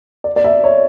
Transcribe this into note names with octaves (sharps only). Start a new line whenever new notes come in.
D5
D5
E5
C#5